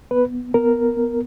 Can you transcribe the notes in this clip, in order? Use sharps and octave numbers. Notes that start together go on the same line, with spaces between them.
B3 B4
B3 A#4
B3